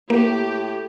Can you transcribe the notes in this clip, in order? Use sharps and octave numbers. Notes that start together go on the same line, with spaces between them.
A2 A#3 G4